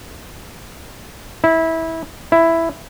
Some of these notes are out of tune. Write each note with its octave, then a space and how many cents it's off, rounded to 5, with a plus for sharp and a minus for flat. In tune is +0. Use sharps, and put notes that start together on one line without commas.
E4 -20
E4 +5